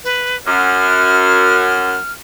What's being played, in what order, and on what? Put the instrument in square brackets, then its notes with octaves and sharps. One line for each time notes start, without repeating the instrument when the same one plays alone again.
[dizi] B4
[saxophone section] F#2 [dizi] F6